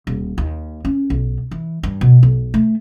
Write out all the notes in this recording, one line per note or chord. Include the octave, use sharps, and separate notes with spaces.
D#1
D#2
C#4
B1
E3
G2
B2
B1
A3